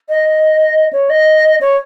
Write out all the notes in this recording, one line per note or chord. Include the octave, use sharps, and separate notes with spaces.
D#5
C#5
D#5
C#5